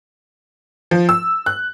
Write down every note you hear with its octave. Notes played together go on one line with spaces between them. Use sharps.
F3
E6
F#6